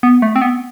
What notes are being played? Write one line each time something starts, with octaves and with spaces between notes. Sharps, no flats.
B3
A3
C4
B3